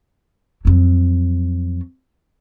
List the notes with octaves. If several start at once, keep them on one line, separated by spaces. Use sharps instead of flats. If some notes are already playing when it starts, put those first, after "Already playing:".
F2 F#3